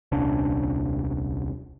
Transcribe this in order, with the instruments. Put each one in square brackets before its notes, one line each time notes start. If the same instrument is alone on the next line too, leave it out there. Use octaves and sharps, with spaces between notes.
[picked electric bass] D#1 C2 C#4 D4